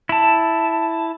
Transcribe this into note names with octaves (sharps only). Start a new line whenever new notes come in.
E4 A5